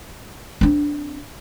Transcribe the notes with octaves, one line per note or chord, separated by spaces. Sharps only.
C4 D4